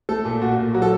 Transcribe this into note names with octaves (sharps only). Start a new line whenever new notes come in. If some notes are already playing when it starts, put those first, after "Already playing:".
A3 A4
A#2
A#2 F#4
A#2
F#3 F#4
A4